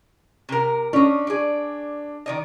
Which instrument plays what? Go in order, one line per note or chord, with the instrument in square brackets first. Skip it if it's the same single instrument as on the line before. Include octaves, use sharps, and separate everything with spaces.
[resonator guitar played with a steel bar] C3 A#4
[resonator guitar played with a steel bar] C#4 D#5 [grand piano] D4
[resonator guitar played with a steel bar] G#4 D5
D#3 D5 D#5